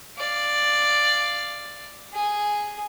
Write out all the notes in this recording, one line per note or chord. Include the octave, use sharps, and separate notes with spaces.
D5 F5
G#4